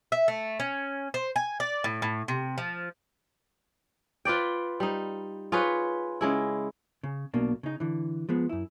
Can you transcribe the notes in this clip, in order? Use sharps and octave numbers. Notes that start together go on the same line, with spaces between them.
E5
A3
C#4
C5
G#5
D5
A2
A2
C3
F3
F4 B4 D5 G5
G3 D#4
F4 G#4 B4 C#5
C#3 G#3 E4
C#3
B1 B2 A#3 D4
C#3 D#4
D3 E3
F3 G#3 B3
F#2 E4